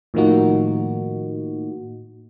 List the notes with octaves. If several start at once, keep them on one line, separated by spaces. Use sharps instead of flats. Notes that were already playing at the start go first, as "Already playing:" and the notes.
A2 D#3 F3 A#3 D#4 F#4